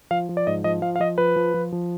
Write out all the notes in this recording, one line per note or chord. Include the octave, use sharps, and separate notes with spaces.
F3 F5
F3
D5
G#2 D#5
F3 D#5
F3 F5
F5
F3 D#5
F3 B4
F3
F3
F3